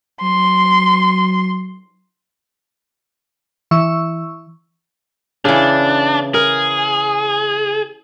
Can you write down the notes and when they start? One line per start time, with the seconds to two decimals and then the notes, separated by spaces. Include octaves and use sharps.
0.22 F#3 C6
3.71 E3 C#6 E6
5.45 C#3 E3 D4
6.34 G#4 A#4